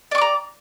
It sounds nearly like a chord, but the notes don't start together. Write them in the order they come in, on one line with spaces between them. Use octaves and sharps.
D5 C#6 D6 A#5